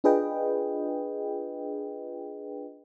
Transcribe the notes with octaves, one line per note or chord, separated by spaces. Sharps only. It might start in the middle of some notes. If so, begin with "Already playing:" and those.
D4 F4 G#4 B4 D#5 G5